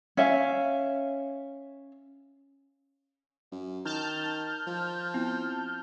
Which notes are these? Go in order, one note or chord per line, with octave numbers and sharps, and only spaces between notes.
C#4 E5 F5
F#2
D#3 A5 F6 G6
F3
B3 C4 E4